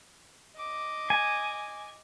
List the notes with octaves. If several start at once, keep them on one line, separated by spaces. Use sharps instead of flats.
D#5 D6
G#5